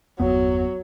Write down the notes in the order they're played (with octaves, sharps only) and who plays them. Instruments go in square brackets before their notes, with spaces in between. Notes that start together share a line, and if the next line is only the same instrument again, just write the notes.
[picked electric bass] G1 E2 B3 [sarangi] F#3